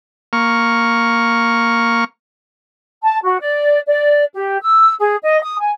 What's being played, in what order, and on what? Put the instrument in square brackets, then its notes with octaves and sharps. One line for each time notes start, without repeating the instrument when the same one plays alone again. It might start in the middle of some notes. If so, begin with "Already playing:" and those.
[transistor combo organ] A#3 C#6 F6
[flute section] A5
F#4
D5
D5
G4
E6
G#4
D#5
D#6
G#5